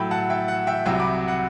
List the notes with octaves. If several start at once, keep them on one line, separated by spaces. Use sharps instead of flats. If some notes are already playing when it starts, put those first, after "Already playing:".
Already playing: A2 F#3 G5 B5 E6
F#5 A5
E5 G5
F#5
E5 G5
C2 C3 F#3 E5 G5
B5 D6
F#5